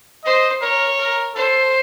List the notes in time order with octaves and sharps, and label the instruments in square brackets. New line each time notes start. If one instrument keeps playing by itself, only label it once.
[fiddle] C5 [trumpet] D#5
[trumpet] A#4 [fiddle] C#5
[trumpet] A#4
[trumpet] A4 [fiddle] C5